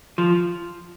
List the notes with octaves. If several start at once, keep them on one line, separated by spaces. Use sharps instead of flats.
F3